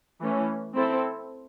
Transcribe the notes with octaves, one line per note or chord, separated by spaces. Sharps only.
E3 A3 C#4
C4 E4 A4